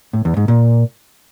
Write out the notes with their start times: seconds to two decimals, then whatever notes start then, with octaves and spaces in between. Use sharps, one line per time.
0.13 A2
0.25 E2
0.37 G#2
0.48 A#2